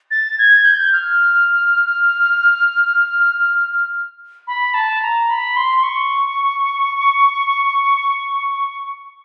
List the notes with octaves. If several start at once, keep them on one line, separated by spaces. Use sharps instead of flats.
A6
G#6
G6
F6
B5
A5
A#5
B5
C6
C#6